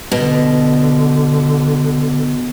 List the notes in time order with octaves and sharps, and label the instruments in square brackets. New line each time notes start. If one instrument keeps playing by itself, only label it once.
[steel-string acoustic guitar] B2 [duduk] D3